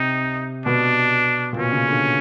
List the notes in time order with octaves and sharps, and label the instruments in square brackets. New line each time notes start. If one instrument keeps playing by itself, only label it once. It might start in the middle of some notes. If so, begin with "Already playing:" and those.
Already playing: [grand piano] C3 [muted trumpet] D#4
[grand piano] B2 [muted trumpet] D4
[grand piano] A#2
[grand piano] B2 [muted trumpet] C#4
[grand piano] C#3
D3